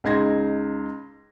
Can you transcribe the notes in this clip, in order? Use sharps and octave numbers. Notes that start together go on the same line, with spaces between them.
C#2 D#4 C6 G#6 A#6